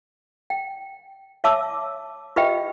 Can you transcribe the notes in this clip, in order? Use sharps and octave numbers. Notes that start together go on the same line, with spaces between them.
G5
C#5 E5 A5 D6 E6
F4 G4 B4 D#5 E5 G5